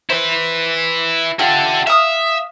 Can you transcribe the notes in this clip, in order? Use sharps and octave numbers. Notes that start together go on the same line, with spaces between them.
E4 B4 C5
F4 G4 A4 E5 F#5
E5 F5 D#6